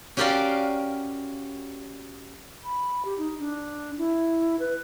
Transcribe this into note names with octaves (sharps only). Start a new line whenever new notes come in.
C#4 F#4 G4 A#4 D5 F5
B5
G4
D#4
D4
E4
B4